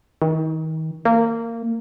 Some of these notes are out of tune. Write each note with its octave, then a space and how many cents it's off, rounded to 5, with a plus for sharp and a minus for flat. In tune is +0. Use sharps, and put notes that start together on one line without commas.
D#3 +35
A#3 -20